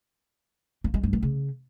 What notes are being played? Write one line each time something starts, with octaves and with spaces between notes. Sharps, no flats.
A#3
G#3
G2
D#3
C#3